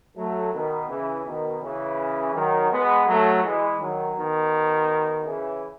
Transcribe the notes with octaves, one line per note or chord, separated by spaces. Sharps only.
F#3 A3
B2 D#3
C#3 E3
B2 D#3
C#3 E3
D#3 F#3
G#3 B3
F#3 A3
E3 G#3
D#3 F#3
B2 D#3
C#3 E3